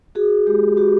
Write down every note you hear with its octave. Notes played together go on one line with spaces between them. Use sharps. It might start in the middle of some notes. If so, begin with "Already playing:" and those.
F#4 G#4
G#3 G4
F#4 G4